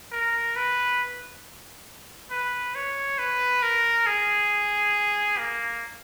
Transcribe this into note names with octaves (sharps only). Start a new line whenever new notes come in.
A#4
B4
B4
C#5
B4
A#4
G#4
A#3